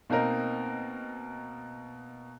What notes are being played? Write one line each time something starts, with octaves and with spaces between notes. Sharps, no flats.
B2 A#3 C4 D#4 A#4